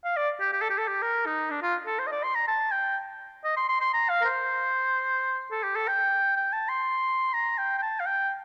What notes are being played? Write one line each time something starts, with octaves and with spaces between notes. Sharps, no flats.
F5
D5
G4
G4
A4
G4
A4
G4
A#4
D#4
D4
F4
A4
C5
D#5
D5
C6
A#5
A5
G5
D#5
C6
C6
C6
A#5
F5
A#4
C5
A4
G4
A4
G5
G5
A5
C6
A#5
G5
G5
A5
F5
G5